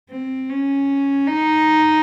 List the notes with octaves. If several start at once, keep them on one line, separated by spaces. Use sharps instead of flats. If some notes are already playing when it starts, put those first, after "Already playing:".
C4
C#4
D#4